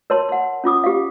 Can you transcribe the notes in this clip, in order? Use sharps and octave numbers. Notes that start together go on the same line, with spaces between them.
A#4 C#5 A5 C6
F#5 C6
C#4 F4 D6 D#6
G4 F5